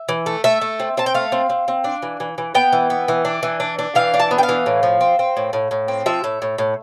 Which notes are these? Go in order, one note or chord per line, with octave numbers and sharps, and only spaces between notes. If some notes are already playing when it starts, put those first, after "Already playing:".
Already playing: E5
E3
A3
A3 E5
A3
C4
C4 A5
G5
A3 F5
C4
C4
C4
D4
E3
E3
E3
B3 G5
E3
B3
E3
D4
E3
D4
D4
E3 F5
D4
A5
B3
G5
F5
E3
A2
F3
C4
C4
A2
A2
A2
C4
F3 E5
A2
A2
A2